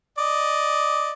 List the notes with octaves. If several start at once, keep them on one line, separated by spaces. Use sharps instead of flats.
D5 D#5